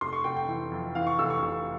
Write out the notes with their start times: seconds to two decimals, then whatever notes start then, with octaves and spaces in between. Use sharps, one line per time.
0.01 F1 C6
0.13 C#6
0.24 F1 G5
0.37 G5
0.47 E3
0.71 F2
0.95 E3 F5
1.07 C#6
1.19 F1 E6
1.30 C#6
1.42 F1